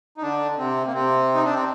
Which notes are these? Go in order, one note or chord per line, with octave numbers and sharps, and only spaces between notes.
D#4
D3 D4
C3 C4
A#3
C3 C4
D#4
D4
C4